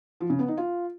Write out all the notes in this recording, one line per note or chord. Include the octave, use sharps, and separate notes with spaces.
F3
C#3
B3
D#4
F4